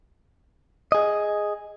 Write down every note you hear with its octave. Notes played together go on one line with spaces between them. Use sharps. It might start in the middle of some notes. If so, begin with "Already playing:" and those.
G#4 D#5